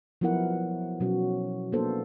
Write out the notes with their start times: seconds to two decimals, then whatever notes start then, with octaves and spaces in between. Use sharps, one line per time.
0.21 F3 F#3 B3 E4 A#4 F#5
1.00 B2 F#3 C#4 F#4
1.72 A#3 B3 D4 A4 C5